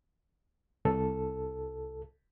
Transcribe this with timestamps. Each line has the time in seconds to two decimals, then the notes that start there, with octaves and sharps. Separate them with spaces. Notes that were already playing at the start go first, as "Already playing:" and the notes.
0.85 C2 A4